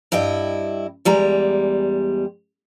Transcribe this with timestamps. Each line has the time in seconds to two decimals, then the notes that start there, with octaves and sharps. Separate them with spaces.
0.12 G2 E4 D#5 G5
1.05 E2 G3 G#3 A#5